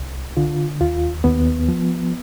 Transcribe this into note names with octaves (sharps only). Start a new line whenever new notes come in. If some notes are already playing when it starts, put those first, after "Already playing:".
Already playing: C2
D3 F4
D#2 F4
D#2 B3
F3